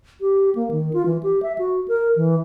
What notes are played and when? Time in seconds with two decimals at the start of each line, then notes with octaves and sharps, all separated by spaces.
0.21 G4
0.55 A#3
0.71 D#3
0.93 F4
1.06 E3
1.23 G4
1.43 E5
1.58 F#4
1.88 A#4
2.16 E3